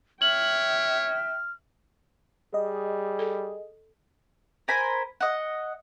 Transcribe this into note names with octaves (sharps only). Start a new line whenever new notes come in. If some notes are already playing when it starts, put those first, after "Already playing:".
C#5 E5 G5 F6 F#7
G3 G#4 D#5
A4
A#4 C5 G#5 B5
D#5 F#5